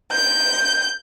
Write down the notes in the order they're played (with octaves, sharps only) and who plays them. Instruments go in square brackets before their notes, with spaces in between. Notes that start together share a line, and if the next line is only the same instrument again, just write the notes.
[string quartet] G6